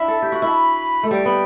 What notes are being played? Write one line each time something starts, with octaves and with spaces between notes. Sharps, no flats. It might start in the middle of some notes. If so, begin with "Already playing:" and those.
Already playing: D4 E4 E5
A4
G4
F#4
E4
A5
B5
A3
G3 G5
B3